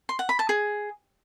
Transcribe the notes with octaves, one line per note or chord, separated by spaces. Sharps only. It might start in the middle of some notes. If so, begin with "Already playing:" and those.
C6
F#5
B5
A5
G#4